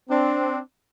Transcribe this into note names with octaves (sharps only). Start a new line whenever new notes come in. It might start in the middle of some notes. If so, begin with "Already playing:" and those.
C4 D4